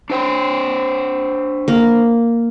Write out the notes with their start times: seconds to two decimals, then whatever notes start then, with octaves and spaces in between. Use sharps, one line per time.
0.10 D4 C5 G5
1.68 A#3